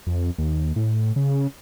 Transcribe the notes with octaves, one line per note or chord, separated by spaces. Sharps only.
F2
D#2
A2
C#3